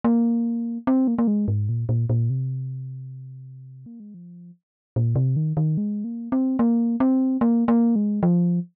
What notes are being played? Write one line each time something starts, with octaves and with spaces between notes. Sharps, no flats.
A#3
C4
A#3
A#3
G#3
G#2
A#2
A#2
A#2
C3
A#3
G#3
F3
A#2
C3
D#3
D#3
G#3
A#3
C4
A#3
C4
A#3
A#3
G#3
F3